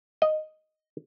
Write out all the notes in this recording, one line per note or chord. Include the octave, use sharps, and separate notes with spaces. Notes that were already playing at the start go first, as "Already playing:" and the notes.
D#5